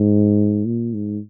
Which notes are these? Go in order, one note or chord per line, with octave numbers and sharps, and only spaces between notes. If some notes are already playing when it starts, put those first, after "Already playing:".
Already playing: G#2
A#2
G#2